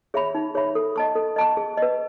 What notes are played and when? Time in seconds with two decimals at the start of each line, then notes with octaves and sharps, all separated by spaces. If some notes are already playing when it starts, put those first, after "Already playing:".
0.14 G#4 C#5 E5 B5
0.35 D#4
0.55 G#4 C#5 E5 B5
0.75 A4
0.96 D#5 A5 C#6
1.15 A4
1.36 D#5 A5 C#6
1.57 G#4
1.77 B4 D#5